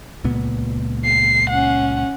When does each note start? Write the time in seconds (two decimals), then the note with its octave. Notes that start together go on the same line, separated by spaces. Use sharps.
0.24 C#2 A#2 B3
1.05 C7
1.50 C#4 F#5